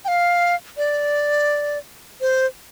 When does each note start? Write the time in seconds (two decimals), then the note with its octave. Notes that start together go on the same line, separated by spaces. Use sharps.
0.05 G5
0.08 F5
0.77 D5
2.21 C5